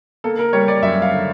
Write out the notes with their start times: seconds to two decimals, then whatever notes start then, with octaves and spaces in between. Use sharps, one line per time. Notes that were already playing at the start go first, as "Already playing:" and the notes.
0.24 A#3 A4
0.39 A#4
0.53 G3 C#5
0.68 D5
0.82 F#2 E5
1.02 F5
1.12 D3